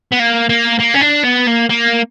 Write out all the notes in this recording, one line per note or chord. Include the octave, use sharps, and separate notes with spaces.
B3
A#3
A#3
A#3
C#4
D4
B3
A#3
A#3